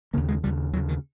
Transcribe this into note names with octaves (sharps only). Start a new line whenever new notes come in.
D#2 C#3 A#3
G#3
D#2 C#3 G3
D#2 C#3 F#3
D#3